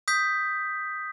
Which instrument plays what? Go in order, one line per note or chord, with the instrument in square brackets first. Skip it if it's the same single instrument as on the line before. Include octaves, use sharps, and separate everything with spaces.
[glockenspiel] D#6 G6 B6